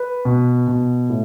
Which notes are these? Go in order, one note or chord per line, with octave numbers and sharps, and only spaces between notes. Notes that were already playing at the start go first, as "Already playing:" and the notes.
Already playing: B4
B2
B2
A2